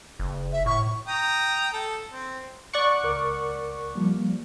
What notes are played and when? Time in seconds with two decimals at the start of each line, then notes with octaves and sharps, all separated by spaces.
0.20 F#1
0.52 E5
0.66 A2 C#6
1.08 G5 A#5 D#6
1.73 A4
2.11 C4
2.73 D5 F#5 C#6
3.03 C#2 A#4 D6
3.95 F3 G3 A#3